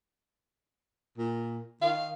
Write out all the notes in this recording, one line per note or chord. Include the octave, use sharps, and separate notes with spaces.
A#2
D#3 F5